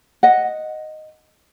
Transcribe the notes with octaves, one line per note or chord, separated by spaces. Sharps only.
D#5 F#5